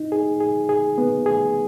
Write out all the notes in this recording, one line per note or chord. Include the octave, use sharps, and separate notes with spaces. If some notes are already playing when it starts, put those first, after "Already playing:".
Already playing: D#4
G#4
G#4
G#4
B3
G#4